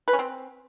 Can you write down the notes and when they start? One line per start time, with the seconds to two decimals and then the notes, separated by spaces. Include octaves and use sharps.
0.08 B4
0.13 C#4
0.19 C4